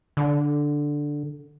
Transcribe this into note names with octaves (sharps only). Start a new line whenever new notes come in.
D3